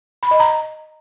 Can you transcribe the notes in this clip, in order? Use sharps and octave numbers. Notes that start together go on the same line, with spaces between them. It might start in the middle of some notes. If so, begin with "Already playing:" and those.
B5
D#5
A#5